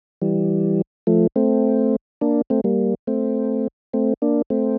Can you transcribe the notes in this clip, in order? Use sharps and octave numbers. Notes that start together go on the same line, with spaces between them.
E3 G3
F3 A3
A3 C4
A#3 D4
A3 C4
G3 A#3
A3 C4
A3 C4
A#3 D4
A3 C4